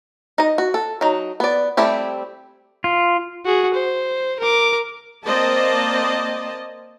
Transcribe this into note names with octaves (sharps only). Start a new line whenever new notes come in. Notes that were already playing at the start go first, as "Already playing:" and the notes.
D#4 D#5
F#4
A4
F#3 D#4
B3 D5
G3 A3 C4 E4 G4
F4
F#4 G#4
C5
A#4 D6
A#3 C4 C5 D5 D#5 A5